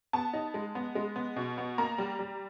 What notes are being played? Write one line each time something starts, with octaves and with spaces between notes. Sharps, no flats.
B3 A5
D#4
G#3
B3
G#3
B3
B2
B3
A#3 A#5
G3
G3